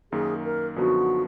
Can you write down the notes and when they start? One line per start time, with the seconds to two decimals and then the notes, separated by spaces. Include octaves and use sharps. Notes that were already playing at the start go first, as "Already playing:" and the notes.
0.12 F#2 D#3 A#3 G#4
0.44 A#4
0.76 F#2 D3 F3 B3 D#4 F#4